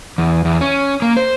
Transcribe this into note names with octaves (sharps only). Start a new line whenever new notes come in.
E2
E2
C#4
A#3
C5